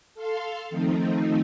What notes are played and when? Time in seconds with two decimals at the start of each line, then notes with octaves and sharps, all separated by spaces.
0.14 A4 F5 C6
0.70 D#3 F3 A3 C4 D#4